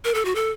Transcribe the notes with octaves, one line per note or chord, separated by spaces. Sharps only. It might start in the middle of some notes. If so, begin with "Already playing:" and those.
A#4
A4
F#4
A4